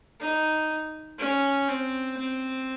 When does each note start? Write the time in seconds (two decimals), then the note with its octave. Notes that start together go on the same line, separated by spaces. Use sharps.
0.20 D#4
1.19 C#4
1.69 C4
2.17 C4